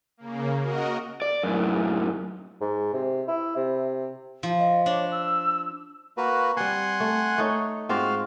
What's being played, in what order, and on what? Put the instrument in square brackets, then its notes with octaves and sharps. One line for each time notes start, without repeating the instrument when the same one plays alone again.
[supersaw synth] C#3 A#3
F#4 A#4 D#5
[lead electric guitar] D5
F#2 A2
[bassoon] G#2
C3
E4
C3
[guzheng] F3
[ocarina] D#5
[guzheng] D4 [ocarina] C#5
[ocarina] E6
[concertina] A#3 F#4 B4
[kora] G3 C4 [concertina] F#5 G#5 C6
[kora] A3
A3 D#4 C#5
[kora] G#2 C4 F4 [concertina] F#4 F5